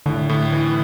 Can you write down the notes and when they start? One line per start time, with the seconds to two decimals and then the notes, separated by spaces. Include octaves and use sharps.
0.06 A2 D3
0.29 A2
0.52 E3